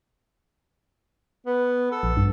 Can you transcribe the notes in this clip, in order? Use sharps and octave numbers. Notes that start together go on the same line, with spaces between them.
B3
A4
A#1
G2